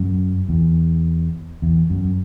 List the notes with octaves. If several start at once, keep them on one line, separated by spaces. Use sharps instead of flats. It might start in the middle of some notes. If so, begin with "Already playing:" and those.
Already playing: F#2
E2
E2
F#2